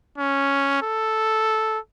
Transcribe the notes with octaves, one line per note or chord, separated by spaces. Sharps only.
C#4
A4